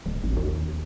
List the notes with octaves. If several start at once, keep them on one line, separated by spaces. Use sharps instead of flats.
D1
A1
D#2